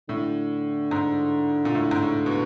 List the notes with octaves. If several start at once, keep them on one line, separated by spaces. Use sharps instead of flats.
A2 D3
G#2
A#2
A2
G#2
A2
B2